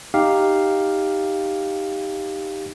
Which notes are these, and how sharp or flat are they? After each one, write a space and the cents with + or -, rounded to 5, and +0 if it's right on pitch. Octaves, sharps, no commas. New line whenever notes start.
D#4 +0 G4 +0 F5 +0